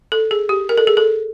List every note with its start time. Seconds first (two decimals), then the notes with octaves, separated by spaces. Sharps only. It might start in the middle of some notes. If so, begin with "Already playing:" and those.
0.12 A4
0.31 G#4
0.49 G4
0.69 A#4
0.78 A4
0.87 G#4
0.97 A4